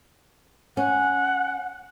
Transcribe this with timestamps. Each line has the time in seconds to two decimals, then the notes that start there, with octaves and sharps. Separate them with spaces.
0.77 C#4 F#5